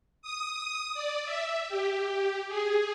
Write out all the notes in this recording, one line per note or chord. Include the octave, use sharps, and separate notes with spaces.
D#6
D5
E5
G4
G#4